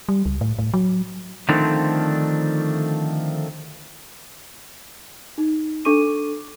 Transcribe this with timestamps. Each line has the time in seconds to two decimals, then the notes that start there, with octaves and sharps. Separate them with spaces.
0.09 G3
0.26 C#2
0.41 A2
0.59 A2
0.74 F#3
1.49 D3 D#3 F3 A3 C4 D4
5.38 D#4
5.85 D4 A4 C#6 D6 D#7